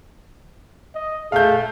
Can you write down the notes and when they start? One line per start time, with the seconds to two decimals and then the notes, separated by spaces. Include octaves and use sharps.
0.95 D#5
1.32 A3 G#4 F5 G6